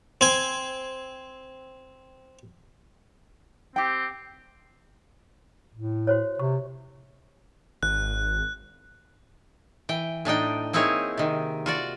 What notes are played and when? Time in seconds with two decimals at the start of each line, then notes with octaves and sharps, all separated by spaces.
0.21 C4 G#5
3.76 C4 G4 G5
5.75 A2
6.07 F#4 C5 C#5
6.39 C3 C#6
7.83 G#1 F#6
9.89 E3 G5
10.25 A2 D4 D#4 G5
10.73 A#3 C4 D#4 E4 G#4 C#5
11.17 C3 D#3
11.66 F4 F#4 D5